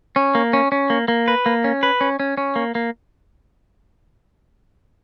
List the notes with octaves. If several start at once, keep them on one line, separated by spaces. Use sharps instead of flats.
C#4
A#3
C#4
C#4
A#3
A#3
B4
A#3
C#4
B4
C#4
C#4
C#4
A#3
A#3